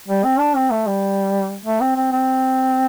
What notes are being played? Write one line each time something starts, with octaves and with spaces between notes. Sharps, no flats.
G3
C4
D4
C4
A3
G3
A3
C4
C4
C4